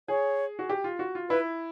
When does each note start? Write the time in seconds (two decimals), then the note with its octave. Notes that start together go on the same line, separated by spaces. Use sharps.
0.08 G#4 C#5
0.59 F#4
0.69 G4
0.84 F4
0.99 F#4
1.15 F4
1.30 E4 B4